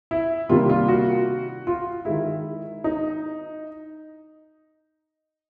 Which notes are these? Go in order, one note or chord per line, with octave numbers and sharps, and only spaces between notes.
E4
C3 D#3 G3 A#3 F4
F4
F#4
F4
D#3 G#3 E4
D#4